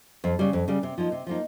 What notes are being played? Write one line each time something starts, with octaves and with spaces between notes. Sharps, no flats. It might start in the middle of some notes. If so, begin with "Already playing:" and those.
F2
C#3 G3
F2
C#3 G3
C3
F3 A#3 D#4
C3
F3 A#3 D#4